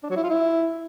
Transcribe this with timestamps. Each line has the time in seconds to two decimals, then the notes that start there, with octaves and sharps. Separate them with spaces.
0.03 D4
0.10 F#3
0.17 E4
0.23 F4
0.30 E4